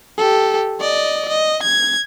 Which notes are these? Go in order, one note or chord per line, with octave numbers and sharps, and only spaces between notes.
G4 A4
D5 D#5
D#5
G#6